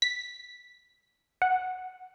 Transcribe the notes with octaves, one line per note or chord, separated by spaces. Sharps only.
B6
F#5